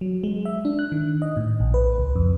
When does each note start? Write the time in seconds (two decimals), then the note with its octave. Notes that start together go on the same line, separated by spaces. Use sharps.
0.01 F#3
0.23 G#3
0.45 E5
0.65 D4
0.79 F#6
0.92 D#3
1.22 D#5
1.37 A2
1.60 A#1
1.74 B4
1.98 C#2
2.16 F2